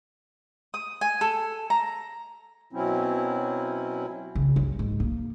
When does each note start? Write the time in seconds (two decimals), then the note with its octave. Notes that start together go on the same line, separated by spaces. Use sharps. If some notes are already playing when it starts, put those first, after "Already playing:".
0.74 D#6
1.01 G#5
1.21 A4
1.70 A#5
2.73 B2 F#3 C4 C#4 E4
4.35 C#3
4.56 F#2
4.79 G#2
5.00 A#3